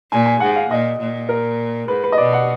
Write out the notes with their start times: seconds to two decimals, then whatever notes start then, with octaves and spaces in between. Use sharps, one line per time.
0.11 A#2 G#5
0.26 G#5
0.40 G#2 F#5
0.56 F5
0.70 A#2 D#5
0.99 A#2
1.29 A#4
1.88 G#2 B4
2.04 B4
2.12 D#5
2.18 B2 D5
2.33 F#5